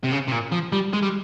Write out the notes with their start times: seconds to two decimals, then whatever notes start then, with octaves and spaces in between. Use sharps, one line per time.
0.03 C3
0.11 C#3
0.28 C3
0.31 A#2
0.52 F3
0.72 G3
0.93 G#3
1.02 G3